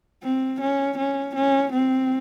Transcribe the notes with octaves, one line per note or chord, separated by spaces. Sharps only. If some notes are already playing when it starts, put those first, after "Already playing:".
C4
C#4
C#4
C#4
C4